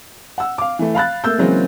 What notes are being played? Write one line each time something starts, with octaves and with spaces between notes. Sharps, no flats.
F#5 E6
F5 D6
E3 A3
F5 B5 F#6 A6
A3 A#3 E6 G6
C#3 E3 F#3 G#3 A#3 C4